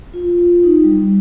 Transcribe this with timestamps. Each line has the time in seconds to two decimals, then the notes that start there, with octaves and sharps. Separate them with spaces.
0.14 F4
0.63 D#4
0.84 G3